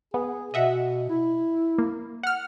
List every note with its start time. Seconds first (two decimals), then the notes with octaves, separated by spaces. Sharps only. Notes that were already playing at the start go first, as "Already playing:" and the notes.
0.14 B3 G#4
0.54 B2 D#5 E5 F#5
1.09 E4
1.78 A#3
2.23 F#5 F6